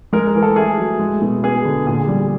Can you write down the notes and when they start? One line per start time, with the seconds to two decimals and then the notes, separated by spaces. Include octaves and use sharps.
0.13 G#3 A#4
0.27 A#4
0.35 E3
0.43 A4
0.56 A3 G#4
0.78 F#3
1.00 G#3
1.22 B2
1.43 B3 G#4
1.65 D3
1.87 A#2 G#4
2.08 G3